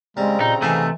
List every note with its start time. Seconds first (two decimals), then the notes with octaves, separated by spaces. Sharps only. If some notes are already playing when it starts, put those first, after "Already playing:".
0.17 C#3 G3 G#3 C4 A#5
0.40 A#2 D#4
0.62 C3 E3 A3 D#4 F5 G#5